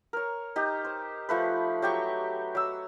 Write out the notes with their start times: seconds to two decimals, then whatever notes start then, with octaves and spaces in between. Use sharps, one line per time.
0.13 A#4 C#5
0.56 D#4 G4
0.85 C5
1.29 F3 A3 B4
1.82 F#3 G4 G5 C#6
2.55 F#3 E6